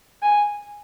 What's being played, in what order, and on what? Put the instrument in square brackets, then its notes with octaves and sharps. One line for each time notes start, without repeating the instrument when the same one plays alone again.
[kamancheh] G#5